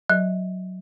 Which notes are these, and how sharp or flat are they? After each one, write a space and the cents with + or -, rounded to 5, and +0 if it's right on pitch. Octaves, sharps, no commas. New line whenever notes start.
F#3 +0 D#5 -30